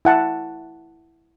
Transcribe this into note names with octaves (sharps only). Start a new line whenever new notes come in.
E4 F#5 A5